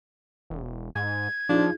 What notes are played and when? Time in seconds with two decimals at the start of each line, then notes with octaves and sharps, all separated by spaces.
0.50 E1
0.95 G#2 G#6
1.49 F3 D4 D#4 F4 G#4